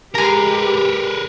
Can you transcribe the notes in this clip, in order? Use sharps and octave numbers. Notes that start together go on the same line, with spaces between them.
G#3 G4 G#4 A#4 B4 A#5